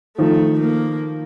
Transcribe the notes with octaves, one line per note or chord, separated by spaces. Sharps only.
D#3 F3 A3
A#3